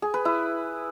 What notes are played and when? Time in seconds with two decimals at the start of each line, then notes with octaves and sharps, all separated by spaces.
0.02 G#4
0.14 B4
0.25 E4